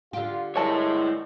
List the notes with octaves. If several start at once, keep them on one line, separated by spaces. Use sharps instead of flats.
D3 F4 G4
G2 G#3 E4 A#4 C#5 A5